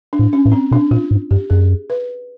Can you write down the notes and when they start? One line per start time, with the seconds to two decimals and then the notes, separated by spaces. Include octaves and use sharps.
0.13 D4
0.19 A2
0.33 C#4
0.46 A2
0.52 C4
0.71 B2 D4
0.91 A#2 F4
1.11 G#2
1.31 G2 G4
1.50 F#2 G#4
1.90 B4